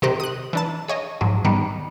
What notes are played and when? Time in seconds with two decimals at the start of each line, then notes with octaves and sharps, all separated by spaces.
0.02 C3 D#3 D#4 G4 C5 F#6
0.20 D#6 F#6
0.53 E3 D4 A5
0.88 G#4 C#5 D#5
1.21 G#2 F3 F#3
1.44 G#2 D#3 G3 B3